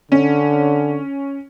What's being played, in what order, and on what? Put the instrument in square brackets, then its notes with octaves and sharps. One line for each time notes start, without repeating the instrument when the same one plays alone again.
[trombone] D3 [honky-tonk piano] C#4